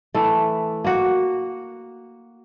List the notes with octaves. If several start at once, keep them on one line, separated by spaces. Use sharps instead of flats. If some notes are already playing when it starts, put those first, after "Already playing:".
E3 A3
A#3 F#4